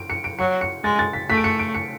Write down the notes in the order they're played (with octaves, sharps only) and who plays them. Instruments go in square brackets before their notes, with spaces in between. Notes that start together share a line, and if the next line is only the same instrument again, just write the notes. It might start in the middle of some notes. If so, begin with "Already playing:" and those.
Already playing: [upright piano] D7
C#7
D7
[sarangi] F#3 [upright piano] C#7
[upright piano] C#7
[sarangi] G#3 [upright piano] A6
[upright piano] A6
B6
[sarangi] A3 [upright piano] B6
[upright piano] D7
C#7
D7
C#7